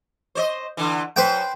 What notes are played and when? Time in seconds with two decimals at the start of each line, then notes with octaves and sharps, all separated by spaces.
0.35 C5 C#5 D#5
0.77 D3 E3
1.16 F#2 B4 C5 G5